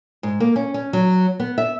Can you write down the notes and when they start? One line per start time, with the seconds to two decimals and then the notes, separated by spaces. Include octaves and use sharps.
0.23 G#2
0.40 A#3
0.56 C#4
0.74 C#4
0.93 F#3
1.40 B3
1.58 E5